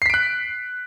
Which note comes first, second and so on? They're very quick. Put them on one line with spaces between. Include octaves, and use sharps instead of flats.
C7 B6 D7 F#6